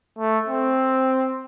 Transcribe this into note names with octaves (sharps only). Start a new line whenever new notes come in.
A3
C4